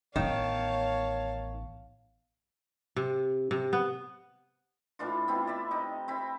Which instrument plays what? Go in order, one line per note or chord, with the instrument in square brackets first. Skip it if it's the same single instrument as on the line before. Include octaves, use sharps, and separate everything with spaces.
[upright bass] A1 B3 [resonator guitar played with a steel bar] D#3 [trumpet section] C#5 [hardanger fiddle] F5 A5
[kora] C3
C3
B3
[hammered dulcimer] A2 E3 D4 F4
B3 C4 E4 F4
D5 E5 B5
C3 D#4
C4 E4 B5